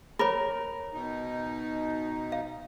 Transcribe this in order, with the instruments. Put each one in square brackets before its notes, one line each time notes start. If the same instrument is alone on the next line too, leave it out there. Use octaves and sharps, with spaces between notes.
[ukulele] A#4 [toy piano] C#5 B5
[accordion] B2 D#4
[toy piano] F5